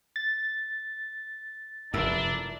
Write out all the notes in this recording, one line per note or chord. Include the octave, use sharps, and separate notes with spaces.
A6
F1 F#2 D4 E4 A#4 E5